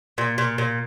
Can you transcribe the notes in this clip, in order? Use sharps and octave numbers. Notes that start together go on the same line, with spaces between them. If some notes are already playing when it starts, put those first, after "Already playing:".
A#2
A#2
A#2